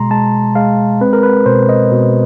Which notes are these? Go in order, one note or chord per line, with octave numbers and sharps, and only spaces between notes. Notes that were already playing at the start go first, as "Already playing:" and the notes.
Already playing: B2 G#3 A#5 C6
G#3 A5
G#3 F5
C4 B4
A#4
B4
B2 C5
D#5
B2